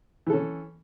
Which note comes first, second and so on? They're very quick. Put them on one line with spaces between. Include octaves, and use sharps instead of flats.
E3 A4 C#4